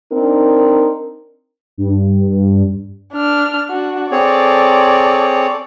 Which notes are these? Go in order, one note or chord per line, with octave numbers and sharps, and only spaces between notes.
C4 D4 D#4 A#4
G2
D4 F6
D4 F#4
C4 G#4 A4 C#5 D5